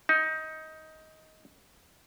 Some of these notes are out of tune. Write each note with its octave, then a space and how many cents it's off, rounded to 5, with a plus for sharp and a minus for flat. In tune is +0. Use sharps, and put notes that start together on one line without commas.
D#4 +15